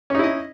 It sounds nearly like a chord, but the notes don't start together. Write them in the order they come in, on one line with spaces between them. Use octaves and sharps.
C#4 D#4 E4 D#5